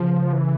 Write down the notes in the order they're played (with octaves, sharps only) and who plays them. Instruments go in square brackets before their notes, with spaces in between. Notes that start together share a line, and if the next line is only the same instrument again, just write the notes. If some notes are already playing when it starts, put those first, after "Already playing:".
Already playing: [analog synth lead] C#3 [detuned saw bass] F3
[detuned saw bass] E3